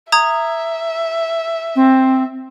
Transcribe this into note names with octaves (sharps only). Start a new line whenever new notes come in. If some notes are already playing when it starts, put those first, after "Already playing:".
E5 A#5 D#6 G#6
C4